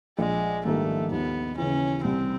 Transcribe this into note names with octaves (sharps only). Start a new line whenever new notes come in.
A#1 G#3
G#2 D#3 G3 A3 A#3
D#2 B3
C#3 E3 C#4
C2 C4